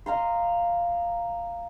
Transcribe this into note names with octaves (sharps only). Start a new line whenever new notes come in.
D#5 F5 A#5 C6